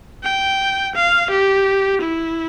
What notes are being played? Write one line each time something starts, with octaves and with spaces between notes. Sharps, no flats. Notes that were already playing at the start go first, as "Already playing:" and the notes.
G5
F5
G4
E4